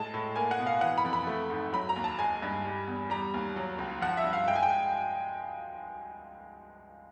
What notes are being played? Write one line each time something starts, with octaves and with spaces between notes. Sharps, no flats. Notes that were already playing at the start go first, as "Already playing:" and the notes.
Already playing: A2 G#3 A5
A2
A#3 G#5
F#5
B2
F5
E3 F#5
B5
F2
B5
A3
G#2
F#3 B5
A#5
D#2
A5
G#3 G#5
G2
G3
E2
G3 A#5
D#2
F#3
C#2
F3 F#5
E5
G2
F5
G#3 G5
G#5
G5